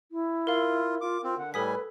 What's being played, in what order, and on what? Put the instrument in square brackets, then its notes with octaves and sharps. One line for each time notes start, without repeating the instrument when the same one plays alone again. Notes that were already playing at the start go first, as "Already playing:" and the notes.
[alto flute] E4
[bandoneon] F4 [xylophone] A#4 F5
[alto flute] F4 [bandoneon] D6
[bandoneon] C4 [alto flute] F4
[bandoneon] D3 [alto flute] F#5
[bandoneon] A2 G3 G#5 [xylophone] A4 D#6 B6 [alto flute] B4